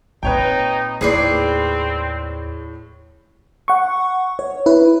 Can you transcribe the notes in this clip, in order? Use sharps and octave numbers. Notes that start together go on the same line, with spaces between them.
A#2 C4 D#4 B4 C#5 G5
D#2 A2 C4 G#4 B4 D5 C7
F#5 C#6
C#5
E4 B4